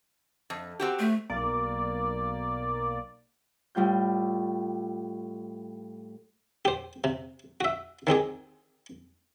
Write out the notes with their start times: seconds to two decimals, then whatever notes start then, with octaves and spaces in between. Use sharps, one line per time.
0.50 F2
0.80 C4 F#4 G4
0.99 A3
1.30 B1 A#3 D5
3.75 A2 G3 F4 G6
6.65 G4 C5
7.04 C3
7.61 F#4 E5
8.07 D#3 C4 G4 G#4